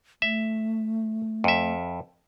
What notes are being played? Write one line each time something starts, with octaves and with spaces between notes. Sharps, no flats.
A3 E5
F2 E5